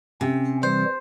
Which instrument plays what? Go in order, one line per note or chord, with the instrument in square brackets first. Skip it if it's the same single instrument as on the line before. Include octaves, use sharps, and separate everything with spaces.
[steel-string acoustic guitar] C3 [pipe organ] C#4
[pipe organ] E3 G3 [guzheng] C5